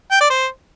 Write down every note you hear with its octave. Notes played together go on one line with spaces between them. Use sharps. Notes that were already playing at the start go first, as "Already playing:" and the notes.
G5
D5
C5